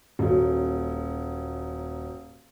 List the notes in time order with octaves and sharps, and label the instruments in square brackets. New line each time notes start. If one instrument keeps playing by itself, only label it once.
[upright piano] D#1 F#3